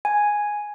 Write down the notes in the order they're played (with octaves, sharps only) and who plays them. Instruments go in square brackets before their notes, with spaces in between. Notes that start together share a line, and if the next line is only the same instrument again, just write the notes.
[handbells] G#5